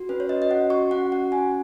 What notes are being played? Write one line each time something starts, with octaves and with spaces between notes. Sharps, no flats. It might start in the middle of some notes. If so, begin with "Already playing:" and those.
Already playing: F#4
C#4 B4
C#5
F#4 D#5
D#5
C#4 F#5
F#4 C#6
C#4 F#5
F#4 F#5
C#4 G#5